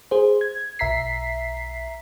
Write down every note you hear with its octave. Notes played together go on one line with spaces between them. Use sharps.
G#4 C5
G#6
B1 E5 A#5 B6 C7